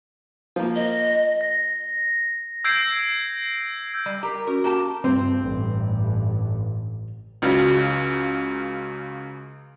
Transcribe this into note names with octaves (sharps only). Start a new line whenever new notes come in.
F3 A#3
D#5
A#6
E6 G6 G#6 C7 D7
G3
G4 A#4 A#5
C#4 F#4 A#4
A#3 G4 A5
G2 C4
A1 G2
C#2 C#3 F#3